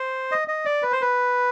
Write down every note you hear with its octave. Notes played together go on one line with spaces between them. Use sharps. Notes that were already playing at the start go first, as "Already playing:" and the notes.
Already playing: C5
D#5
D#5
D5
B4
C5
B4